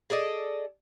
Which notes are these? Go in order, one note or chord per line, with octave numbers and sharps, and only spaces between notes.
G#4 A4 D5 D#5